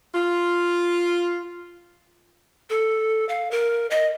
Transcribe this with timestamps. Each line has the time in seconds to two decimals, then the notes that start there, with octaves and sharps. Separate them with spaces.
0.14 F4
2.70 A4
3.29 F5
3.51 A#4
3.91 D#5